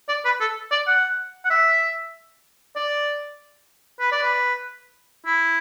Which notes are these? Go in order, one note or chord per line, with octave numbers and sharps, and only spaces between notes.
D5
B4
A4
D5
F#5
F#5
E5
D5
B4
D5
B4
E4